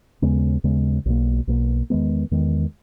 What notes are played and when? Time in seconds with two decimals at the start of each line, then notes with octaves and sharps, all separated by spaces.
0.22 D#2 C#3 G#3 B3
0.64 D#2 C#3 G#3 B3
1.06 B1 B2 A#3
1.47 B1 B2 A#3
1.90 E2 D#3 G#3 B3
2.31 E2 D#3 G#3 B3